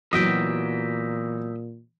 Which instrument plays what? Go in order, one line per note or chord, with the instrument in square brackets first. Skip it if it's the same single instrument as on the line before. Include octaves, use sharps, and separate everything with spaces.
[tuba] A#2 [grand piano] E3 [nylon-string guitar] F#3 B3 F#4 [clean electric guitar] D#5 E5 G5